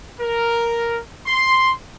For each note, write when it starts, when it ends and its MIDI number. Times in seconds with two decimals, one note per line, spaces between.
0.20 0.99 70
1.26 1.73 84